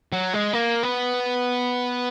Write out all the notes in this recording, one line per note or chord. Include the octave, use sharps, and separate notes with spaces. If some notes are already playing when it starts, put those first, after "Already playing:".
F#3
G#3
A#3
B3